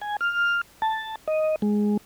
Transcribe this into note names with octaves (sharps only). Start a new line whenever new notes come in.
G#5
F6
A5
D#5
G#3